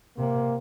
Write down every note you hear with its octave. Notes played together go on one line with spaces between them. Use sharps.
C3 A#3